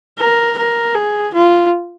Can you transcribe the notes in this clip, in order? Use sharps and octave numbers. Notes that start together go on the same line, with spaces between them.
A#4
A#4
G#4
F4